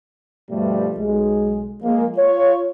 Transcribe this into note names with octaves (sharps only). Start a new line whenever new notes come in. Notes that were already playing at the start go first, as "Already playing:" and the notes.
G2 B2 F3 G3 A3
B1 G#3
F3 G#3 A#3
F4 C#5